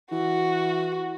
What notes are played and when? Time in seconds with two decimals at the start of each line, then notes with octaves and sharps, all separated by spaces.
0.11 E3 F#4